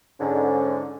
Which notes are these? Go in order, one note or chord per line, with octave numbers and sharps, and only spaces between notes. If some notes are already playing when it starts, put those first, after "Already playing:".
G#2 D3 C#4